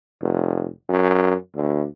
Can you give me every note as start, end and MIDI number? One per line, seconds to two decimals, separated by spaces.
0.21 0.67 29
0.89 1.34 42
1.55 1.85 38